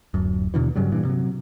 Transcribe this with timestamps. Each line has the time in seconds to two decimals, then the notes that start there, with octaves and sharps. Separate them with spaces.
0.14 D1 F#2
0.54 D#2 B2 D3 E3
0.76 G2 C#3 F#3 G3
0.92 G2 A#2 E3
1.05 C3 F#3